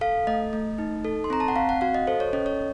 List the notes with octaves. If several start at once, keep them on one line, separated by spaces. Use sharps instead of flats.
A4 F5
A3 D#5
A3
D#4
A4
C6
C4 A#5
A5
F#5
C4 F5
F#5
F#4 F5
D#5
A4 C5
C#5
C#4 D#5
C#5